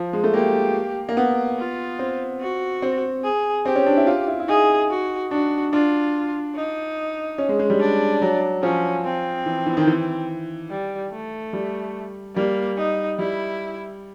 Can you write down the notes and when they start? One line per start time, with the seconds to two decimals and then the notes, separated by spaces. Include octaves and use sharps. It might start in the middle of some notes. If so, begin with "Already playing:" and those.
Already playing: F3
0.13 G#3
0.24 A3
0.34 A#3 G4
1.09 A#3
1.17 B3
1.58 F4
1.99 C4
2.41 F#4
2.82 C4
3.24 G#4
3.65 C4 G4
3.76 C#4
3.86 D4
3.97 E4
4.07 F4
4.28 E4
4.40 E4
4.48 D#4 G#4
4.90 F#4
5.31 D4 F#4
5.73 D4 F4
6.55 D#4
7.38 C#4
7.49 G#3
7.59 G#3
7.70 G3
7.80 D4
8.22 F#3
8.63 F3 C#4
9.05 C4
9.46 E3
9.66 E3
9.77 D#3
9.87 E3
10.70 G3
11.12 A3
11.53 G3
12.36 G3 A#3
12.77 D#4
13.19 G3 E4